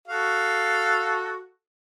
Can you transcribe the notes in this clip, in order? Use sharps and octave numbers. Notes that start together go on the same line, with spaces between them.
F#4 A4 F5